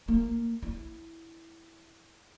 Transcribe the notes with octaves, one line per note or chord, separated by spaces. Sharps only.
A#3
E4